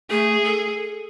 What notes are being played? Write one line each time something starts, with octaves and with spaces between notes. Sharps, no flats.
A3 G#4
A4